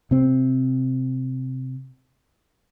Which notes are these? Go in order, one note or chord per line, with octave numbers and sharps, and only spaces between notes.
C3 C4